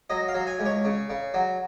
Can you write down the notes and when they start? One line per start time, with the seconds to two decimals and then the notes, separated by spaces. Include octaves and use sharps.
0.10 F#3 D#5
0.28 F5
0.35 F#3
0.47 G#5
0.59 C#2
0.66 C#5
0.85 C#3
1.10 C#3
1.34 F#3